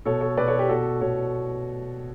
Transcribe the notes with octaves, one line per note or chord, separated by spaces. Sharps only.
B2 A4 C#5
A4 C#5
B2 B4 D5
A4 C#5
G4 B4
B2 F#4 A4
B2 A4 C#5